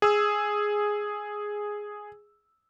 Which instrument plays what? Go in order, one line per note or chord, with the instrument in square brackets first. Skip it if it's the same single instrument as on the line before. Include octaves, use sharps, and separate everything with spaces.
[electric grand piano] G#4 E6